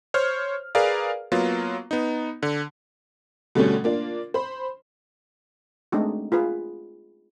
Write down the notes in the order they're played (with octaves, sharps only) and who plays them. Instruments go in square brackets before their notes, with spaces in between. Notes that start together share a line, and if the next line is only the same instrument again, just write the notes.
[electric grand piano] C5 C#5 F6
G#4 A#4 B4 D5 F5
F#3 A#3 B3 F4
B3 D#4
D3
[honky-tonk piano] B2 D3 G3 A3 C#4
A#3 D4 F4
C5 B5
[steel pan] G#3 A3 C4 D4 D#4 F#4
F4 G#4 B4